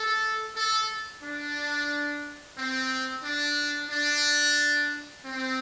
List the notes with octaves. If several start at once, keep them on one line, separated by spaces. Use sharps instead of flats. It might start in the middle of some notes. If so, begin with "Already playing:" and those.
Already playing: A4
A4
D4
C4
D4
D4
C4